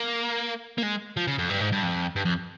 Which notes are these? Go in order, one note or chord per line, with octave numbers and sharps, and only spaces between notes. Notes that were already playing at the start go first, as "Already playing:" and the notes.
Already playing: A#3
A#3
G#3
F3
C#3
F2
G2
G#2
G2
F2
G2
F2